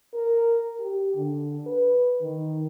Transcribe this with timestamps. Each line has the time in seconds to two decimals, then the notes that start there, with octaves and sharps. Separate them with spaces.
0.14 A#4
0.79 G4
1.15 D3
1.67 B4
2.22 D#3